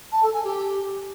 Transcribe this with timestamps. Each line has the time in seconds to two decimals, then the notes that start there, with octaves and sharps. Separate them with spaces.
0.12 A5
0.23 A4
0.34 G#5
0.44 G4